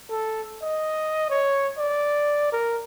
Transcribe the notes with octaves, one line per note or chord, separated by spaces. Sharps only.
A4
D#5
C#5
D5
A#4